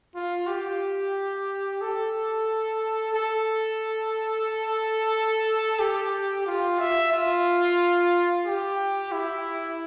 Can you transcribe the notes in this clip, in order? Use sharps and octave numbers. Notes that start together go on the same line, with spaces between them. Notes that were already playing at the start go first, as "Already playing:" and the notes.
F4
G4
A4
A4
G4
F4
E5
F4
G4
E4